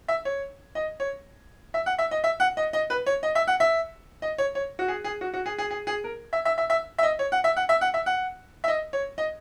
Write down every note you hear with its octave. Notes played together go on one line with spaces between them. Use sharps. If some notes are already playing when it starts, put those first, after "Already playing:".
E5
C#5
D#5
C#5
E5
F#5
E5
D#5
E5
F#5
D#5
D#5
B4
C#5
D#5
E5
F#5
E5
D#5
C#5
C#5
F#4
G#4
G#4
F#4
F#4
G#4
G#4
G#4
G#4
A#4
E5
E5
E5
E5
E5
D#5
C#5
F#5
E5
F#5
E5
F#5
E5
F#5
E5
D#5
C#5
D#5